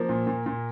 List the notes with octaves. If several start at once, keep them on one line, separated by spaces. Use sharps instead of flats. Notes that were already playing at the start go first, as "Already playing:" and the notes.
Already playing: F3 A#3
A#2
A#2
A#2